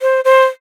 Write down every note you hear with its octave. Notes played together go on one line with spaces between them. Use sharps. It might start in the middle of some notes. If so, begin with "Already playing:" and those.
C5
C5